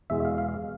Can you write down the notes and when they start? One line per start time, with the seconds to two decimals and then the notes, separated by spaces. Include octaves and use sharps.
0.10 E2 B2 G#3 B3 E5
0.25 F5
0.38 F5